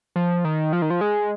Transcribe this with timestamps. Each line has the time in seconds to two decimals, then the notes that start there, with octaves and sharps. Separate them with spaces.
0.16 F3
0.45 D#3
0.73 F3
0.82 D#3
0.90 F3
1.01 G#3